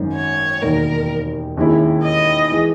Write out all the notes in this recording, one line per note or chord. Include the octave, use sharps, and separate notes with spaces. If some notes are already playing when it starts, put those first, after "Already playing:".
Already playing: G#1 F#2 D#3 F#3 C#4
C#5
E1 D#2 D#3 A#4
D#2 D#3 G#3 C#4 E4
D#5
E3 G#3